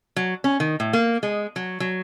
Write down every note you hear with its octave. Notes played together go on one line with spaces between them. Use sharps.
F#3
C#4
D#3
A2
A#3
G#3
F#3
F#3